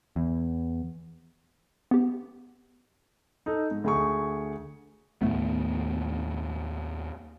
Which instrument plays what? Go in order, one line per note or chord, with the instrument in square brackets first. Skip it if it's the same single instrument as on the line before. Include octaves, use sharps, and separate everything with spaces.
[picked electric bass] E2
[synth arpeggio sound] B3 G4
[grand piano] D#4 A4
G#2
D2 G#4 C#6
[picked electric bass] D#2 A2 A3 B3